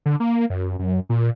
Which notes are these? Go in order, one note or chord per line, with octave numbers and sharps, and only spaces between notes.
D3
A#3
F#2
F#2
A#2